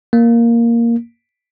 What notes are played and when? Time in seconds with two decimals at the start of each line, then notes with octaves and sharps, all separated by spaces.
0.13 A#3